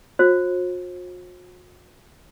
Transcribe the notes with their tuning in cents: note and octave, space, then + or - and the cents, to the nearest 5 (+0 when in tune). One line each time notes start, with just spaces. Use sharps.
F#4 -45 C5 +40